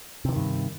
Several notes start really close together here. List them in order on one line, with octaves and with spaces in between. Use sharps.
C3 E3 D#3 G2